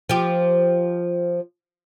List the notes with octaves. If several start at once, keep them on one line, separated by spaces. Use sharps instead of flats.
F3 G4